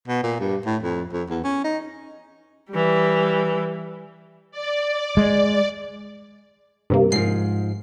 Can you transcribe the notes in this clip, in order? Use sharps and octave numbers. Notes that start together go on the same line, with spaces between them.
B2
A#2
G2
A2
F2
F2
E2
C#4
D#4
E3 G3
D5
G#3
G2 C3 A#3
G#2 F3 C7